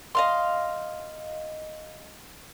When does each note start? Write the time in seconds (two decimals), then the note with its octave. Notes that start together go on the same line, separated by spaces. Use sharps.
0.15 D#5 F5 C6